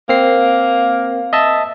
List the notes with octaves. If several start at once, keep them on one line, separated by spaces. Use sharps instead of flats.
A#3 C4 C7
D#5 E5 A5